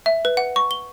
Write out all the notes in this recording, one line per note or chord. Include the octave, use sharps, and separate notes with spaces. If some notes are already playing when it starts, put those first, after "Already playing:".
E5
B4
F#5
C#6
G7